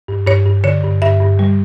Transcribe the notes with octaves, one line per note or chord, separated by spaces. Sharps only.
G2
G2 C#5
G2
D3 C#5
G2
G2 E5
G2
G3